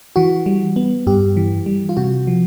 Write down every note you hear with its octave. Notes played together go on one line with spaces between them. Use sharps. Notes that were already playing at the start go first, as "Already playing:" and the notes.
E3 F#4
G3
B3
G2 G4
E3
G3
F4
C3 F#4
F3